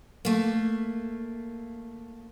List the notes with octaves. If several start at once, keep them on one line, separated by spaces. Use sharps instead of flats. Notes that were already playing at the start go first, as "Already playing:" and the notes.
A3 A#3